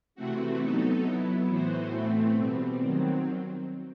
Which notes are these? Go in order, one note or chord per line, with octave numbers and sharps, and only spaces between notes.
C3 E3 A3 C4 F#4
F#3 B3 D#4 A4
F#3 B3 E4
A2 E3 B3 F#4 C5
A2 E3 A3 C4
B2 G3 C4
D#3 F#3 C4